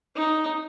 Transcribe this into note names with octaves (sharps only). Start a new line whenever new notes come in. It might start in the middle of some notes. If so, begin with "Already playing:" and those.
D#4